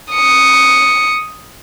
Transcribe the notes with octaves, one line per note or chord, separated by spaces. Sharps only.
D#6 C#7